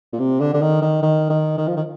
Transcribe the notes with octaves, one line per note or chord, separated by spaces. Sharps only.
A#2
C3
D3
D3
D#3
D#3
D#3
D#3
D#3
F3
D#3